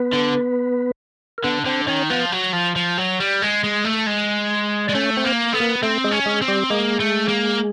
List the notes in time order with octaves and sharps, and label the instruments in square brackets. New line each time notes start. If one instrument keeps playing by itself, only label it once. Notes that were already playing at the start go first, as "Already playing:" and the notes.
Already playing: [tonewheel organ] B3 B4
[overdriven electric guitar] D3
[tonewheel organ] A#4
[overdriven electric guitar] D3 [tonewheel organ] B3 B4
[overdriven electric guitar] D3 [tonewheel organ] C4 C5
[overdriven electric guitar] D#3 [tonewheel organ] C#4 C#5
[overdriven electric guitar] F3 [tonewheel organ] B3 B4
[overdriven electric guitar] F#3
F3
F3
F#3
G3
G#3
G#3
A3
G#3
[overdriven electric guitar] G#3 [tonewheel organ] D5
[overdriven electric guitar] A3 [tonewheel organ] C#4 C#5
[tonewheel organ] C4 C5
[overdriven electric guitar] A#3
[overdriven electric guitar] B3 [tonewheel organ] A4
[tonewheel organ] A#3 A#4
[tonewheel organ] A3 A4 [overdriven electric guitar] C4
[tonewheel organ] G#3 G#4
[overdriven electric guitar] C#4
[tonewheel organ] G#3 G#4
[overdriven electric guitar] C4
[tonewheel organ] G3 G4
[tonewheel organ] G#3 G#4 [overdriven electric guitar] A#3
[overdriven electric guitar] A3
A#3